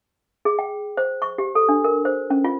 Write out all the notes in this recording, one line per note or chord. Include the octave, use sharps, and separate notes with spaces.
G#4
G5
C5
C#6
G4
A4
D4
A#4
C5
C#4
F4